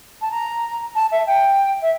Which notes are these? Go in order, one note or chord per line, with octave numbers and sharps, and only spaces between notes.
A5
A#5
A5
E5
G5
E5